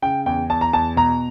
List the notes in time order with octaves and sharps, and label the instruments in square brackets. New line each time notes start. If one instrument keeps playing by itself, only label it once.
[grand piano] C#3 G5
E2 G5
E2 A5
A#5
E2 A5
B2 A#5